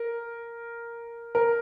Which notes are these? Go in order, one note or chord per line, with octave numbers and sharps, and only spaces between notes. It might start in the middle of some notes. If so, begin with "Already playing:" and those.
Already playing: A#4
A#4